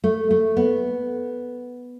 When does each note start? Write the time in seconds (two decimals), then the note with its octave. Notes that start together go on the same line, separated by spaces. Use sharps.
0.04 A3
0.31 A3
0.57 B3